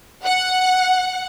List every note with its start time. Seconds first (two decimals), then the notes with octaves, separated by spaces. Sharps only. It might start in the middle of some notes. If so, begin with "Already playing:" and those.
0.24 F#5